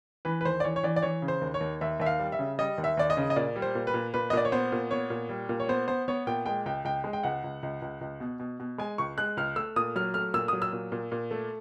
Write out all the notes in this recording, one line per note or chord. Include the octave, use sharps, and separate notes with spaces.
E3 B4
B4
D#2 C5
D5
E3 C#5
C#5
E3 D5
D5
E3 C#5
C#3
C5
D#2
C#5
D#2
D#2 E5
D#2 E5
F5
G3
E5
C#3
G3 D#5
D#2
E5
D#2 D5
D#5
C#3
D#5
A#2 D5
G3
C5
A#2
B4
A#2
A#2 B4
D#5
A#2 D5
C#5
B3 C5
A#2
B3 C#5
A#2
G3
A#2
C#5
B3 C5
B3 C5
B3 C#5
A#2 G5
G#3 G5
C#2 G5
C#2 G5
G#3
G5
C#2 F#5
C#2
C#2
C#2
C#2
B2
B2
B2
G#3 G#5
C#2 C#6
G#3 F#6
C#2 F6
A3 E6
A#2 D#6
F#3 F6
A3 F6
A#2 E6
F#3 D#6
E6
A#2
A#2
A#2
A3